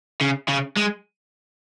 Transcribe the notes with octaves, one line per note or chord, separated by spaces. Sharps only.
C#3
C#3
G#3